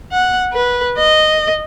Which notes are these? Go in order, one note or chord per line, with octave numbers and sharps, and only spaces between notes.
F#5
B4
D#5